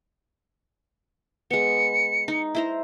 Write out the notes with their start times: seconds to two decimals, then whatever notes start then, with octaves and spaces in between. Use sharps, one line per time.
1.51 G#3 B3 C#7
2.28 D#4
2.55 E4 C5 A#5